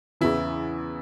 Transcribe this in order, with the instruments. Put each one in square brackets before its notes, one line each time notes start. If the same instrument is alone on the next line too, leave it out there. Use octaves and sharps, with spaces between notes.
[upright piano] E2 C#3 E3 [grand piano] E4